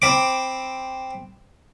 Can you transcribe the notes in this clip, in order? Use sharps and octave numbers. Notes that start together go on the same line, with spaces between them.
C4 B5 D6